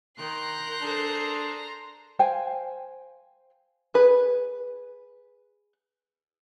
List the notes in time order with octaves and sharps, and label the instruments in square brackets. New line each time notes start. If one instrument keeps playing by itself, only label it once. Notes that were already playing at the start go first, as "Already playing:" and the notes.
[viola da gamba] D#3 [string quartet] A#4 F#6 G6 [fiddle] A#5 C6
[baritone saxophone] D4 [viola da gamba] G#4 A4 C5
[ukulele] C5 F5 G5 G#5
[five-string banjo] G#4 B4